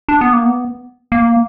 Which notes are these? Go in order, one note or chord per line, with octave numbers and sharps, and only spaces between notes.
D4
B3
A#3
B3
A#3